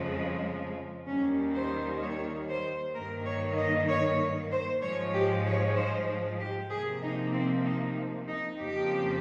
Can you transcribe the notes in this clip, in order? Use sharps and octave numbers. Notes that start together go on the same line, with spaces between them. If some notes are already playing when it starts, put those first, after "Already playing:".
Already playing: F2 C#3 F3 G#3
D#2 D#3 G3 A#3 C#4
C5
C#5
C5
G2 D#3 A#3 A#4
C#5
D#5
C#5
C5
G#2 F3 G#3 C#5
G4
C#5
C5
G4
C3 F3 A#3 G#4
D#4
C4
D#4
D#4
F2 C#3 F3 A#3 G4